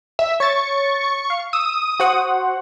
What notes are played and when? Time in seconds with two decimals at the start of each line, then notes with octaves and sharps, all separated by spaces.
0.19 E5
0.40 C#5 C#6 A6
1.30 F5
1.53 D#6 E6
2.00 F#4 C5 F#5